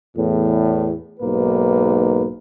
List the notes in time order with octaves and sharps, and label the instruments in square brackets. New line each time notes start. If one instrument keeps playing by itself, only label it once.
[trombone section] E2 A2
B1 G#2 A#3 B4